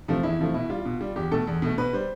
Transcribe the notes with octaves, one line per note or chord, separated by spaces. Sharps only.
C3 F3 A3
E2 E4
C3 F3 A3
B2 E4
G3 F4
B2
G3
E2 G4
B2 A3 A4
E2
B2 A3
B2 B4
G3 C5